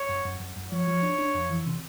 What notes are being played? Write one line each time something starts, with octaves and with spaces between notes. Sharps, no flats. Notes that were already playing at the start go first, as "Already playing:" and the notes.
Already playing: C#5
F#2
F#2
F#2
F#2
F3 C#5
F3
D4
D4
F2
E3
C3